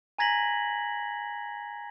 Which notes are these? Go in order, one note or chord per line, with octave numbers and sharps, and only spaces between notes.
G#5 A#5 G#6 A#6 B6 F#7